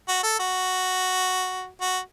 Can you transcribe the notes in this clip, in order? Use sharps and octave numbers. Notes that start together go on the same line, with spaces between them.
F#4
A4
F#4
F#4